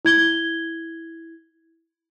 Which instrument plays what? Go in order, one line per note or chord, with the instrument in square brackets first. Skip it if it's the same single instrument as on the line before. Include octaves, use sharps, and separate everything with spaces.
[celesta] E4 G#6 G7